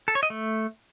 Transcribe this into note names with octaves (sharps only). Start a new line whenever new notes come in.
A4
C#5
D#5
A3